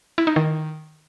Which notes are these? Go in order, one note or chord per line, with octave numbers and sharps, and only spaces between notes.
E4
D#4
D#3